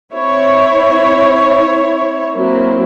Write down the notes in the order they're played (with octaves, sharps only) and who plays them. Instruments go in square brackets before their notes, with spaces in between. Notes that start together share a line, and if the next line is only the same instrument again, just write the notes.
[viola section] C4 E4 C#5
F#3 A#3 C4 E4